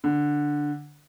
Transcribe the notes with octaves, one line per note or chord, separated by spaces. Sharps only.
D3